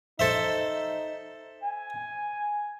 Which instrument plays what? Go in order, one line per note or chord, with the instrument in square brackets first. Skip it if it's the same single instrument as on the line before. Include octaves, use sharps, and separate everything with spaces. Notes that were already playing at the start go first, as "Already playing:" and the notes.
[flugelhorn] D#4 [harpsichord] A4 C5 E5
[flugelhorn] G#5